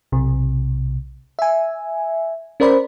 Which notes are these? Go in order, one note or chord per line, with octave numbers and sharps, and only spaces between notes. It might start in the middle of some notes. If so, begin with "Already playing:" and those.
B1 C3
E5 G#5
C#4 A#4 C5 D5 B5